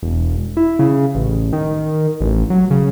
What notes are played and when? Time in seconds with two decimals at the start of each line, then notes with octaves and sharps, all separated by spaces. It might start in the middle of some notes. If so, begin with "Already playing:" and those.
0.03 E1
0.57 E4
0.79 C#3
1.15 A1
1.53 D#3
2.20 A1
2.50 F#3
2.70 C#3